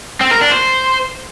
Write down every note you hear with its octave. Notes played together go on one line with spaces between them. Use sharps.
C4
A#4
D4
C5